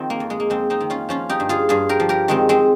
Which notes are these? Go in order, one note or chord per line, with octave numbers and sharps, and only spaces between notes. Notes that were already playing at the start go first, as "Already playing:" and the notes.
Already playing: D#3 F3 C4
A#3
F2
G#3
A#3
F2 G#3 C4
C4 D#4
D#3
C#4 F4
F3 C#4 F4
D#4 G4
G2
F4 G#4
G2 F4 G#4
G4 A#4
F3
G4 A#4
D#3 G#3 C4
G#3 C4